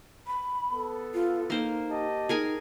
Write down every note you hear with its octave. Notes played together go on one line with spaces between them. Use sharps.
B5
B3 A4
F4
A#3 D#4 C5
G4 D#5 A5
D#4 G#4 A#4 G#5